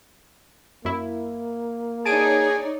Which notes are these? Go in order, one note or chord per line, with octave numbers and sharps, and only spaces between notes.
F#2 A#3 E4
D#4 G#4 C#5 D5 A5 D7 D#7